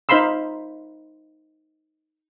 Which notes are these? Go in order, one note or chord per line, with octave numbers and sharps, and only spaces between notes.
D#4 C5 F5 B5 C6 E6